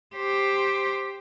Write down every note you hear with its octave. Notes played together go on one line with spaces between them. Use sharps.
G4 C5